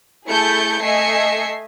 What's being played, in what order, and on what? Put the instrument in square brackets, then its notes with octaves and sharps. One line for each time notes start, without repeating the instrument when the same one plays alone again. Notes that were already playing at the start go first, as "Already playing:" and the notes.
[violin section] A3 E4 G#4 A5 G6 C#7
A3 D#5 E5 G#5 C7 C#7